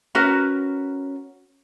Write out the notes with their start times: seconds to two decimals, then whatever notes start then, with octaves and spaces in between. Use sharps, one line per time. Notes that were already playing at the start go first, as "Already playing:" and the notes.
0.15 C#4 F#4 A#4 B4